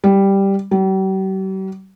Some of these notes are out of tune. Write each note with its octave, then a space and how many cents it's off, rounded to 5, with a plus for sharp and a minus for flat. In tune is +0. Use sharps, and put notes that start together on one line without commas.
G3 +0
G3 -45